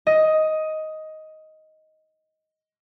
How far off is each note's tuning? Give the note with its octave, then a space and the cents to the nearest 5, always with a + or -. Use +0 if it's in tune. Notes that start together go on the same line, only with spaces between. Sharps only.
D#5 +10